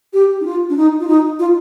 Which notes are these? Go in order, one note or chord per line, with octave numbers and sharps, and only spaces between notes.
G4
D#4
F4
D4
D#4
F4
D#4
F4